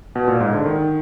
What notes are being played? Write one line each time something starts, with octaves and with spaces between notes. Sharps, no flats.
B2
A#2
G#2
D3
D#3